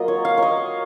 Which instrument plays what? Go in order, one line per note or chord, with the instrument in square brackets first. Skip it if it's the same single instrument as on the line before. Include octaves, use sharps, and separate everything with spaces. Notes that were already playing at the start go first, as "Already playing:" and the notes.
Already playing: [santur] F#3 A#3 F4 D#5
C#5
F5
C#5 D#5